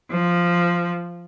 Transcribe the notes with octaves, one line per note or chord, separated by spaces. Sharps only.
F3